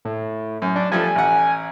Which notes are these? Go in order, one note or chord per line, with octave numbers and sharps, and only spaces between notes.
A2
F#2
D4
F3 G3 A3 G#5
A1 F#5